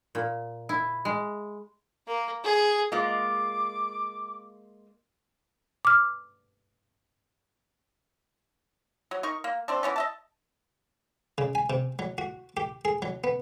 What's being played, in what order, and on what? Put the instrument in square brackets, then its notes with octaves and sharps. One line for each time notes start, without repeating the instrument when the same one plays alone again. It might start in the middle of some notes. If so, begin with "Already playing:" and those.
[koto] A#2
E4
G#3
[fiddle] A#3
G#4
[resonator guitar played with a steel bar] G#3 A#3 F4 [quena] D6
[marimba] D6 F6
[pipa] F#3
D#4 A#4 C#6
A#3
A3 C4 D4
E3 B3 C#4
D#5 E5 A5
[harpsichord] C#3
G#5
C3
F#3
F#4
G4
G#4
F#3
B3